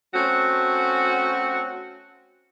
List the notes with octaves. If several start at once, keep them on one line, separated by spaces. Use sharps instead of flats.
A3 C4 C#4 F#4